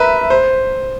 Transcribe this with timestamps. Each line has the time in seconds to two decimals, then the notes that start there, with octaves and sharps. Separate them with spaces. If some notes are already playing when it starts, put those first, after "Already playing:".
Already playing: A#4 B4 E5
0.30 C5